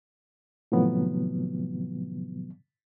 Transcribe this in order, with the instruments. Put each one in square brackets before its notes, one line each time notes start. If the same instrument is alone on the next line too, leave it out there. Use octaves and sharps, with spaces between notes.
[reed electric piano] A2 C3 D#3 F3 F#3 B3